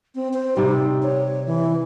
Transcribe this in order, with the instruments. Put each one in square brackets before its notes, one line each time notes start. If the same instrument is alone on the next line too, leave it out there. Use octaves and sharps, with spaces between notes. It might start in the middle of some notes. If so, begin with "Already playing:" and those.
[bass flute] C4
C5
[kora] C3 G3 [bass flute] D#4
[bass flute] C#5
E3